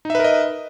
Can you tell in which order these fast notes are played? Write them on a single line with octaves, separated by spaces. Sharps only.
D#4 E5 B4 A#4 D#5